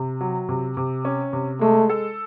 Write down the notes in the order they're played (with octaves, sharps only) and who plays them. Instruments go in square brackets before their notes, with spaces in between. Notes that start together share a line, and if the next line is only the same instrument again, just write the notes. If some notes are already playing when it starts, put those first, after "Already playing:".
Already playing: [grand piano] C3
F#3
C3
C3
C#4
C3
[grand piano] G#3 [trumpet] A3
[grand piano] A4